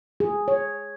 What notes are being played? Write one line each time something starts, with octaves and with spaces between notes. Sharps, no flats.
G#4
C#5